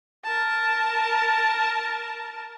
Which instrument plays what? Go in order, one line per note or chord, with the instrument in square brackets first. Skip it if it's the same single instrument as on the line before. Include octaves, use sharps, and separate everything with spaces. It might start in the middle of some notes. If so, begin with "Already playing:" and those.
[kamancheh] A#4 A5